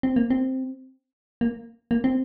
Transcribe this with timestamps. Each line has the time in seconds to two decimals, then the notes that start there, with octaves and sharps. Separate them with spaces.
0.03 C4
0.16 A#3
0.30 C4
1.41 A#3
1.91 A#3
2.04 C4